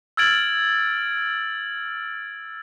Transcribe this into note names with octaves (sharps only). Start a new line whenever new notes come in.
E6 F6 G#6 A6 D7 F#7